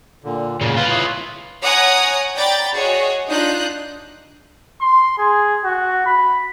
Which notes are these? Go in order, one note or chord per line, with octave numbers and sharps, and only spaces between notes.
A#2 D3
A#2 C#3
F4 B4 F5
E4 C#5 D#6
C#5 F#5 G#5 A#5 D#6 A#6
D5 G5 A#5 B5 G6 A6
F#4 G#4 C#5 D#5
D4 D#4 F4 D#5 F#6 G6
C6
G#4
F#4
B5